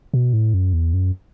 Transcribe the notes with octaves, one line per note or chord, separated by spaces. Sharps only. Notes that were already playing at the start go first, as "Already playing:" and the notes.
B2
A2
F#2
E2
F#2